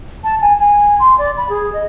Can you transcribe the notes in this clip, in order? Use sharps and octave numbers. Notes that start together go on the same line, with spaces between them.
A5
G#5
G#5
C6
D5
B5
G#4
D#5